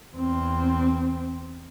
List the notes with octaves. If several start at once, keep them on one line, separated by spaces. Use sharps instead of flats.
E2 C4